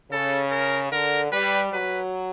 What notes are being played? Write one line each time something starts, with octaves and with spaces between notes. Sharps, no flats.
C#3 A4
A#4
D3 A#4
G3 B4
F#3 B4